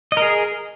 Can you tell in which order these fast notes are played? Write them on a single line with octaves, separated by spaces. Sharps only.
D#5 A#4 G#4